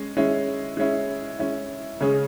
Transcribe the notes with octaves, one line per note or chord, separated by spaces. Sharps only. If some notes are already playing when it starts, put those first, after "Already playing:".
Already playing: G#3 C#4
G#3 C#4 E4
G#3 C#4 E4
G#3 C#4 E4
C#3 G#3 C#4 G#4